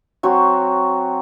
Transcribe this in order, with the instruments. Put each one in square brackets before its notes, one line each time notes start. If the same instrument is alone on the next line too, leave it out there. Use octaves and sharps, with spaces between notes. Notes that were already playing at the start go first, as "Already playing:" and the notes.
[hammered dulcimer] F#3 C4 F#4